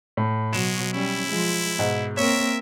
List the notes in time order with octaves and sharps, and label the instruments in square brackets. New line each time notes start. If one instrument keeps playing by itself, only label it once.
[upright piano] A2
[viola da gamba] B2 F#3 [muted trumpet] G#3 [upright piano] E7
[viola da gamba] G3 C#4 [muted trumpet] E4
[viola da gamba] F3 G#3
[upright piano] G#2 [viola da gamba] B2
[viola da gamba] A#3 C4 A#4 [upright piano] C#5 [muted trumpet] E5